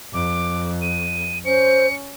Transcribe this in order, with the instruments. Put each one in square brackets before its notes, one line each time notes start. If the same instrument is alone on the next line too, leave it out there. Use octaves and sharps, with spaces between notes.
[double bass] F2 [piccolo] D6
[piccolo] D#7
[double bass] C#4 [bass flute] C5 [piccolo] C#7